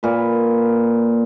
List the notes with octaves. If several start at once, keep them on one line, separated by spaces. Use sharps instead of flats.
A#2 B4